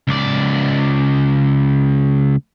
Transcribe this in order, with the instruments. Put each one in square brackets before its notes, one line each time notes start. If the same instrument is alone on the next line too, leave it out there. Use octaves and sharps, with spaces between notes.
[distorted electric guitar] C#2 D5